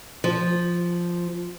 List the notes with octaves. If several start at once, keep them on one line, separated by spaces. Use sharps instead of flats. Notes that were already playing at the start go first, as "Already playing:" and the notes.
F3